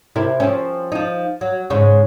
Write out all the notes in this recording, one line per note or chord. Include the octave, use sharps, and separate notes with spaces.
C3 E4 A#4
F3 C4 C#4
F3 D#4
F#3
G#2 C#3 C#4